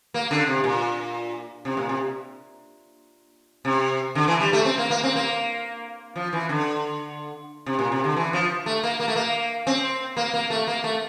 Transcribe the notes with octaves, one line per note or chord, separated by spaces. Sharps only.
A#3
D3
C3
A#2
C3
A#2
C3
C3
D3
E3
G3
A3
C4
A#3
A#3
C4
A#3
F3
E3
D3
C3
A#2
C3
D3
E3
F3
A3
A#3
A#3
A3
A#3
C4
A#3
A#3
A3
A#3
A3